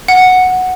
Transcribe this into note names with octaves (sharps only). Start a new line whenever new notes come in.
F#5